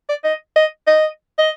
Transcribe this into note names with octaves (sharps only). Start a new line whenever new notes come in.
D5
D#5
D#5
D#5
D#5